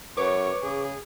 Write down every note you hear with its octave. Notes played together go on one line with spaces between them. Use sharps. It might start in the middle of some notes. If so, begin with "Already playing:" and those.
F#2 B4 C#5 C#6 D6
C#3 G#4